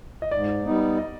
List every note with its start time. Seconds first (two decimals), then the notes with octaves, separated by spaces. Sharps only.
0.22 D#5
0.31 G#2 D5
0.65 G3 B3 D#4
0.98 D#5